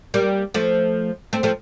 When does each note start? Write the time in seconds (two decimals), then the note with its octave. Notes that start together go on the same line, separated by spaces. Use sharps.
0.14 G3 A#3
0.54 F3 A3
1.33 A3 C4
1.43 F3 A3